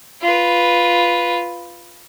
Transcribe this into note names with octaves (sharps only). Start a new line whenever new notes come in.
F4 B4